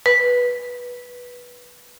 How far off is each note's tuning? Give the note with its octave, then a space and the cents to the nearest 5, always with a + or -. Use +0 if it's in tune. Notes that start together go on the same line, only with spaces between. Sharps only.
B4 -15